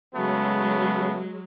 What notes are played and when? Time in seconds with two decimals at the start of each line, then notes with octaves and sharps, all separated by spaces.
0.15 C#3 F#3 G#3 A3 B3